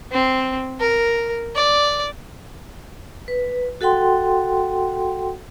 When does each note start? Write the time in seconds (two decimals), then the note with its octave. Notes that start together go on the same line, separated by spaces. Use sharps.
0.12 C4
0.80 A#4
1.55 D5
3.28 B4
3.81 F#4 A4 F#5 G5 C6